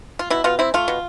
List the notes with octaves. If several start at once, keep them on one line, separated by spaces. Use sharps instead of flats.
F4
B2 E4
B2 F4
C4 E4
A3 F4
B2